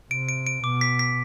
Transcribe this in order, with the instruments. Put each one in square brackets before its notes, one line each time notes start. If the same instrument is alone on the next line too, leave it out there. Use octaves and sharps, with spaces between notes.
[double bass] C3 [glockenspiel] D7
[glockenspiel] D7
D7
[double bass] B2 [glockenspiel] D6
[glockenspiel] B6
B6